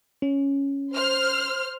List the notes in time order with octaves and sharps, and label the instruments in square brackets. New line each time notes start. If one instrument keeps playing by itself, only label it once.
[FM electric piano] C#4
[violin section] C5 F6